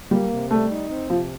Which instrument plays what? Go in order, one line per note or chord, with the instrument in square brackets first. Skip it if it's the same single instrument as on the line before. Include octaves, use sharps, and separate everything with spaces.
[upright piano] G3 [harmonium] A#3
[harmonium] C3
[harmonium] G3 [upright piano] A3
[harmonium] D#4
C4
[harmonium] C3 [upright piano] F3